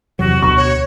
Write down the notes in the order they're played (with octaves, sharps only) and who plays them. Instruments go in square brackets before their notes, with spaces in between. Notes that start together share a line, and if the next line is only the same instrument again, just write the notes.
[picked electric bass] E2 C3 F#3 [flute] F#4
[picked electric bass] D2 B2 [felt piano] C#6
[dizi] C#5